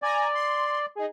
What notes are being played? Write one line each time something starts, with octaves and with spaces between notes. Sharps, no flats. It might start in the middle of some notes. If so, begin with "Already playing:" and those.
D5 G#5 A#5
C6
D#4 G#4